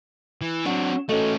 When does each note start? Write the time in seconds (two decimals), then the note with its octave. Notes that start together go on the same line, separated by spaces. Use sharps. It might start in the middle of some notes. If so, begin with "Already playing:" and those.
0.42 E3
0.66 F#3 C4 D4
1.09 A3 C#4 F#4 A4 D#5